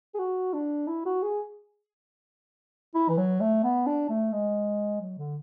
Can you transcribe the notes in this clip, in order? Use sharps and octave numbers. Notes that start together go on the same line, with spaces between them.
G#4
F#4
D4
E4
F#4
G#4
E4
E3
F#3
A3
B3
D4
A3
G#3
F#3
D3